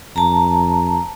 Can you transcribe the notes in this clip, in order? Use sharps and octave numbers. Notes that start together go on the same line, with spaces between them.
F2 A5 A#5